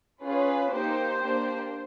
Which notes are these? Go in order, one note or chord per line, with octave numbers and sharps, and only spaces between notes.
C#4 F4 G#4 B4
A#3 D#4 G4 C5
A#3 D4 G4